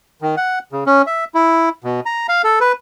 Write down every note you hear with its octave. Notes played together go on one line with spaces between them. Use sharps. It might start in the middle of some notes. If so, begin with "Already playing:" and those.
D#3
F#5
C#3
C#4
E5
E4
B2
A#5
F5
A4
B4